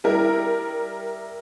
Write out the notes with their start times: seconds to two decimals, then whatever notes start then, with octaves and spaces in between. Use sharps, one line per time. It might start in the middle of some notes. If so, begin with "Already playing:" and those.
0.04 G3 E4 A#4